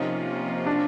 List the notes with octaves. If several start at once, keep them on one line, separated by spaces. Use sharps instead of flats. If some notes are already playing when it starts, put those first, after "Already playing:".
Already playing: C3 F3 A#3 C#4 D#4 F4
D4